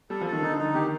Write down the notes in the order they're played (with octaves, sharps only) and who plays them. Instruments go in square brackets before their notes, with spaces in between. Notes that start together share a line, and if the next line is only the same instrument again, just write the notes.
[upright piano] G3 [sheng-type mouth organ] A4
[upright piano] F3
[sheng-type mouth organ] A4
[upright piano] D#3
[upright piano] D3 [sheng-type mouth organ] D#4
[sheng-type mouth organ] D#4
[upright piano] D#3 [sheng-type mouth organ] G4